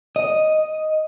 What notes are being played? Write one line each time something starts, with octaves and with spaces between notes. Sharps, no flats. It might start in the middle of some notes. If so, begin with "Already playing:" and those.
D#5